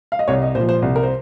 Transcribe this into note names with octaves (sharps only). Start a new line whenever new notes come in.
F5
D#5
C2 C#5
D#5
A#2 C5
F3
C5
C2
A#4
C5